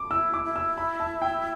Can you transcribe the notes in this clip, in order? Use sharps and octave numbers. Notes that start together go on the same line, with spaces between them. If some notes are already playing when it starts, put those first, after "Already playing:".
Already playing: D6
E4 E6
D6
E4
E6
B5
A5
G5